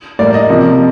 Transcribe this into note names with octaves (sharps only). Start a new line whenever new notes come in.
A2 G3 A#3 D5
D#5
C3 F3 A#3